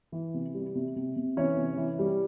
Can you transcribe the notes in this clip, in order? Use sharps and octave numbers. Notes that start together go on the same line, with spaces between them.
E3
C3
G3
C3
C3
C3
E3 C#4 C#5
C3
E3
G3